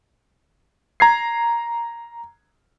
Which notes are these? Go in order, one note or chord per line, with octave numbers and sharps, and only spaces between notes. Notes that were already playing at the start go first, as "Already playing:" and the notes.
A#5 G#6 C7